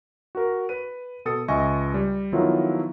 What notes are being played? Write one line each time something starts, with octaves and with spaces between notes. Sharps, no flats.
F#4 A#4
B4 D#7
B2 A4 D#6 A6 C#7
C#2 D#5 E5 G#5 C#6 A#6
G3
D#3 F3 F#3 B3 E4 F4